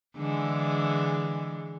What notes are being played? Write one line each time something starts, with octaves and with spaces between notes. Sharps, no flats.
D3 E3 G#3